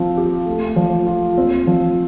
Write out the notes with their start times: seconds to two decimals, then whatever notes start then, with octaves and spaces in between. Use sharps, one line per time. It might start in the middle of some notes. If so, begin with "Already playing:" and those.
Already playing: F3 C4
0.17 G4
0.46 A3
0.76 F3
1.07 F4
1.38 C4
1.67 F3